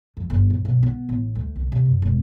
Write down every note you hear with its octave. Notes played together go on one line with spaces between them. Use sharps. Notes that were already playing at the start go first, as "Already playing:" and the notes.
F2
G1
A1
B1
B3
A1
D2
C2
C3
F#2
E1